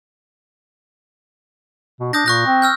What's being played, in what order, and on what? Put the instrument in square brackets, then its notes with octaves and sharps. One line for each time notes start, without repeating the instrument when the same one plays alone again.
[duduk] B2
[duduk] D4 [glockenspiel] D#6 G6 A#6
[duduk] A#2 [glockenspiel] C#6 F#6 A#6
[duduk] C4
[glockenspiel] E6 F6 G6